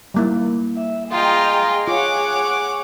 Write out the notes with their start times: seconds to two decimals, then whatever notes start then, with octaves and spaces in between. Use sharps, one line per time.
0.14 G3 A#3 E4
0.76 E5
1.11 F4 G#4 D#5 G5 A#5
1.88 F4 C#5 F#5 D6